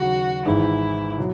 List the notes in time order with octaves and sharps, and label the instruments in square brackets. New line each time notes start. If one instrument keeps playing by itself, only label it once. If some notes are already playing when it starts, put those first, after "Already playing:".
Already playing: [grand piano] D#2 C#3 F#3 [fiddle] F#4
[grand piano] G#1 G#2 E3 G#3 D#4 [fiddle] E4
[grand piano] B2 F#3